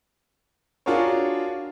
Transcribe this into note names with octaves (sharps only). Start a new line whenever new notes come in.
D4 F4 F#4 G#4 A#4 C#5